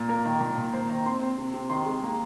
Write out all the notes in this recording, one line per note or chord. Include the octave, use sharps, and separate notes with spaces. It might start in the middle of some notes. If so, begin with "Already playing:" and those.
Already playing: A#2
A#3 A#4
D#3
A#2
A#2
A#3 C5
D#3 A#5
C4 C6
C4
C3
C3
D#3 C6
G#3
A#3